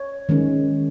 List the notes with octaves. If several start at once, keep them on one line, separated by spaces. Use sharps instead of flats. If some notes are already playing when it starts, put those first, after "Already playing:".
Already playing: C#5
D#3 G#3 C#4